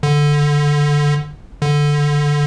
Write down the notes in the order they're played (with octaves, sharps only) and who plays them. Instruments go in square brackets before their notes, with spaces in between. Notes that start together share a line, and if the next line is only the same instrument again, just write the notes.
[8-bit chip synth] D3
D3